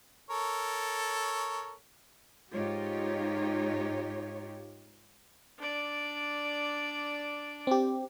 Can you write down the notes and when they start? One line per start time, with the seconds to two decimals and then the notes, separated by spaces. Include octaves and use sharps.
0.30 A4 A#4 C#5
2.53 G#2 D#4 F4 G4 C#5
5.59 D4 D5
7.67 C4 G4